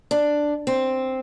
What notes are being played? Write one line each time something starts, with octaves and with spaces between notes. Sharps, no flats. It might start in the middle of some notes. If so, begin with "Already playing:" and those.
D4
C4